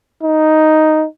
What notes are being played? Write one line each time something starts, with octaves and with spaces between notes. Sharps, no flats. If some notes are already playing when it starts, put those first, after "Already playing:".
D#4